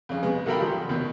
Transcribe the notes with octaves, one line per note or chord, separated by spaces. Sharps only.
F2 C#3
B2 G#3 B3
B1 F#4 A4 A#4 G5 B5
G#1 F3 G4
D#2 B2